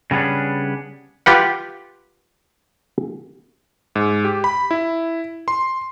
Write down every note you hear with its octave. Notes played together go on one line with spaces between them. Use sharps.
C#3 G3 B3 C#4 D4
F4 G4 B4 F#5
G#2
G4
B5
E4
C6